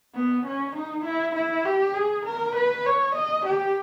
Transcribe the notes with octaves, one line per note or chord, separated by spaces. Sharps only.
B3
C#4
D#4
E4
E4
G4
G#4
A#4
B4
C#5
D#5
G4